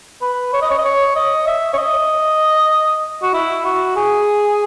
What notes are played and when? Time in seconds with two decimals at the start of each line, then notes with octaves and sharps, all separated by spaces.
0.22 B4
0.53 C#5
0.62 D#5
0.70 C#5
0.79 D#5
0.85 C#5
1.16 D#5
1.47 E5
1.73 C#5
1.78 D#5
3.23 F#4
3.34 E4
3.65 F#4
3.96 G#4